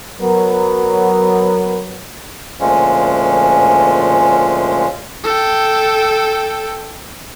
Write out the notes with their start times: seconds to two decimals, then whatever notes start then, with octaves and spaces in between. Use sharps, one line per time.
0.21 F#3 B3 A#4
2.60 D2 A#2 F3 G#3 C#4
5.24 A4 G5